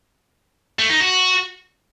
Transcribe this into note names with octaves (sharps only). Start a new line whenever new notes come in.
A3
D#4
F#4